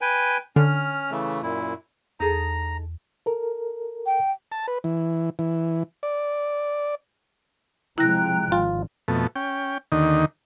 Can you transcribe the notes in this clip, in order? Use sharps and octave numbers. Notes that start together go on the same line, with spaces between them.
B4 G5 G#5
D3 C#4 F6
C#3 E3 A3
F#2 A#2 E4
E2 D#4 G#4 A4 A#5
A4 A#4
G5
A5
B4
E3
E3
D5
C3 F3 G#3 E4 G5 A#5 F#6 A#6
G#1 F4
F2 B2 A3
C#4 G5
D#2 D3 D#3 D#4